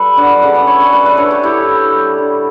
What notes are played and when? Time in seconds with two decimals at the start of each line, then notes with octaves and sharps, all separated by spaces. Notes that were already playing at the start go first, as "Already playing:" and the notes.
Already playing: G3 A4 B4
0.17 D3 D5 F#5
0.42 C#3 D5 F#5
0.55 B4 D5
0.67 A3 A4 C#5
0.80 B4 D5
0.92 A3 B4 D5
1.05 B4 D5
1.17 D3 A4 C#5
1.31 G4 B4
1.43 A2 E4 G4
1.68 A3
1.93 G3
2.18 D3